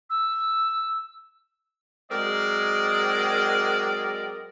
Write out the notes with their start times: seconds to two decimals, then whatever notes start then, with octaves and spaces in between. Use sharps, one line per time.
0.10 E6
2.11 F#3 G#3 C4 A#4 D5 D#5